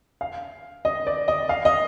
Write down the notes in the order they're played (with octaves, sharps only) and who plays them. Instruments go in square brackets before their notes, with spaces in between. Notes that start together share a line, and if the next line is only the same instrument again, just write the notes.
[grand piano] F5
D#5
D5
D#5
F5
D#5